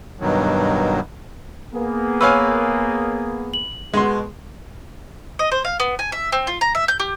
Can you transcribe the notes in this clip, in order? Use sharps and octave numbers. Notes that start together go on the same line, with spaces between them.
G2 B2 D#3 F#3
A#3 B3 G#4
B4 C#5 F5 G#5 C#6 E6
F#7
B2 G#3 C6
D#5
C5
F5
B3
G#5
E5
C4
F4
A#5
E5
G6
G4